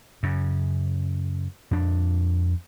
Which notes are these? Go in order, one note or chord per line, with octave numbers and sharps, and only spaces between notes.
F#2 C#3
F2 D4